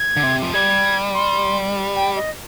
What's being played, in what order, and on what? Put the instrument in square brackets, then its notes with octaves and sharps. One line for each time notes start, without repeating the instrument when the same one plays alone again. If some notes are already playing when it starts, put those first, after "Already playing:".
Already playing: [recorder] G#6
[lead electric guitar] D3
C3
F3
[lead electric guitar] G3 [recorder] G#6
[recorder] C6
G5
D#5